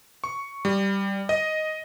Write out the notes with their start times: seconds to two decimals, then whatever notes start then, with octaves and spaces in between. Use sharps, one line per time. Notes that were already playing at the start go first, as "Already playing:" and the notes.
0.24 C#6
0.65 G3
1.29 D#5